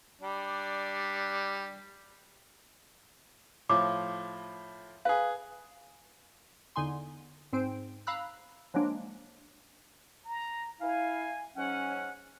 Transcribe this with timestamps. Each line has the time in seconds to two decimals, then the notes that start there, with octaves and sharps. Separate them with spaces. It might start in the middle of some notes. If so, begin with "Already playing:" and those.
0.21 G3 D4
3.70 A2 F3 D6
5.05 G#4 B4 F5
6.76 E2 D3 D#4 G#5 C6
7.53 G#2 C4 C5 D7
8.07 F5 A#5 B5 E6 F#6
8.74 F3 F#3 G#3 A#3 D4
10.25 A#5
10.81 E4 F5 G#5
11.56 G#2 F#3 C#4 F#5